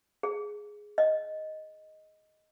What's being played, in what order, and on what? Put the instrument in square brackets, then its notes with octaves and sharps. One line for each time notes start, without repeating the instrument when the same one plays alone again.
[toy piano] G#4
D#5